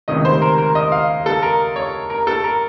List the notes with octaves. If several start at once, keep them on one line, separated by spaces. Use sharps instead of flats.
C#2 C3 D#3 A3 C#4 D#5
C5
A#4
A#4
D#5
F5
A4
A#4
C#5
A#4
A4
A#4